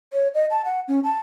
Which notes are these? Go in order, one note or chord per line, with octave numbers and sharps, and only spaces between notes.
C#5
D#5
A5
F#5
C#4
A5